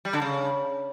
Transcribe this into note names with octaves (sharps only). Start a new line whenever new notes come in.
G3
D3
C#3